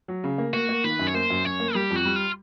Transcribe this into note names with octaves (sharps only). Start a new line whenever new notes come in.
F#3
C#3
A#3
A#3 F#4
A#3
D#3 B4
F#2
C#5
A#3 C5
F#2
F#2 C#5
A#3
G3 G4
F2
F#4
G3
F4